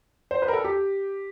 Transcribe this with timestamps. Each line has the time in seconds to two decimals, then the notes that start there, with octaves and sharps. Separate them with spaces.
0.31 C5
0.42 B4
0.48 A#4
0.53 A4
0.64 G4